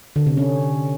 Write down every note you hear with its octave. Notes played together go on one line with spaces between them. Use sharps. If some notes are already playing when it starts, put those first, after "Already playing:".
D3
C3
C#4